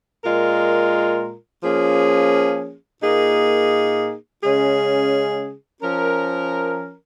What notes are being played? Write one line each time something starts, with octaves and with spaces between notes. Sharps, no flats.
A#2 G#3 F4 A#4
F3 A#3 C#4 G#4
A#2 A#3 D#4 G#4
C#3 G#3 C#4 G#4
F3 C#4 A#4